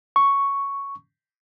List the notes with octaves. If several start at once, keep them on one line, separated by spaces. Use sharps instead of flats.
C#6